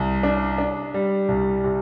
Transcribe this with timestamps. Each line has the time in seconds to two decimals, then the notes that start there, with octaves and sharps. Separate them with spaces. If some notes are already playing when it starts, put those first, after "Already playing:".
Already playing: C2
0.23 D4
0.58 D4
0.94 G3
1.28 C2
1.64 C3